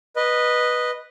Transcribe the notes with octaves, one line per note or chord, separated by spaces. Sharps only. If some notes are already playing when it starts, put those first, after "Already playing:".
B4 D#5